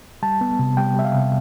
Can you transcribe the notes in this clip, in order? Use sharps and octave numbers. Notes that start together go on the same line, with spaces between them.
G3 A5
B3
C3
G3 G5
G3 E5
F5
C3